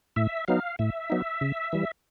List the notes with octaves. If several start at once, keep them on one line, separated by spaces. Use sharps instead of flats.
A2 E5
F#3 B3 D#4 F5
A2 E5
F#3 B3 D#4
C#3
E3 G3